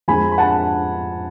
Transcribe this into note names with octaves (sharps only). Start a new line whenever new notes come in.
F2 F3 G#3 G#5 B5
B5
F#5 A5